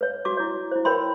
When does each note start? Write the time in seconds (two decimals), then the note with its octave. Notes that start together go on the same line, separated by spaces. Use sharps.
0.01 B4 C#5
0.25 F#4 D6
0.37 E4 C#5
0.71 E4 C5
0.85 A#4 B4 C#5 G5 B5 C6